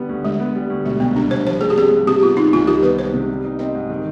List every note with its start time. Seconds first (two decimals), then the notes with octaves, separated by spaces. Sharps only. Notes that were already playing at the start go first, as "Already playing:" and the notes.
Already playing: D3 G3 B3
0.09 D2
0.25 D3 G#3
0.40 B3
0.55 G3
0.70 D2
0.85 B2 G#3
1.00 C2 B3
1.16 G3 D4
1.31 C2 C5
1.46 F3 C5
1.61 G2 G#4
1.70 G4
1.76 C4 G#4
1.92 G2
2.07 C3 G4
2.22 B3 F4
2.37 D#3 D#4
2.53 C2 F4
2.67 D#3 G4
2.83 B3 B4
2.98 G#3 C5
3.14 C3
3.29 G3
3.44 D#4
3.59 C4 D#5
3.75 G#2
3.90 D#3